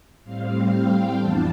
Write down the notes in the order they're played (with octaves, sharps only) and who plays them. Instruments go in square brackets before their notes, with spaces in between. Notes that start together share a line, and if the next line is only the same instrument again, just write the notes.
[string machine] A2 G3 C4 F5
F5
G5
F2 E3 B3 D4 A5